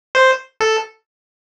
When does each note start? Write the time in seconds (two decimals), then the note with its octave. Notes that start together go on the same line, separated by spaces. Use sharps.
0.15 C5
0.61 A4